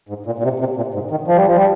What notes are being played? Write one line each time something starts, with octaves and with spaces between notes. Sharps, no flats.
G#2
A#2
A#2
C3
C3
A#2
G#2
D#3
F3
G3
F3
G3